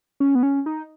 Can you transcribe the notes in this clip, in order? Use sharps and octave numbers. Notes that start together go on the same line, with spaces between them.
C#4
B3
C#4
D#4